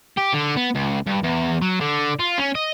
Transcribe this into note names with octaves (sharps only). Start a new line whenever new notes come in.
G4
D3
B3
C#2
G2
E2
F#3
D3
F4
C#4
D#5